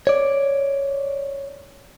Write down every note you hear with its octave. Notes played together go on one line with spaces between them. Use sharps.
C#5 D5